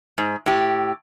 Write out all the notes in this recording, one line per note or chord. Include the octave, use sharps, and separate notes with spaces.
G#2
A2 G4